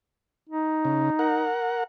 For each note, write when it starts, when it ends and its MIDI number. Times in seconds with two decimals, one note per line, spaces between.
0.49 1.48 63
0.85 1.10 49
1.19 1.84 70
1.19 1.84 78